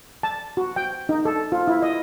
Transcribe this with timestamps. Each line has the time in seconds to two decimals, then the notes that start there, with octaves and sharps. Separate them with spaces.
0.23 A5
0.57 F#4
0.76 G5
1.09 D#4
1.25 A4
1.52 F4
1.68 E4
1.82 D#5